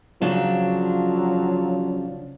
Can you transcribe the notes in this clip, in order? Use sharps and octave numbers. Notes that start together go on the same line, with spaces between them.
C#3 F3 F#3 D4